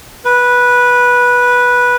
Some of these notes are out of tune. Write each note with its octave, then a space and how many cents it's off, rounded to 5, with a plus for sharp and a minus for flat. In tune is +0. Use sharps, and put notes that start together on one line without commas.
B4 -10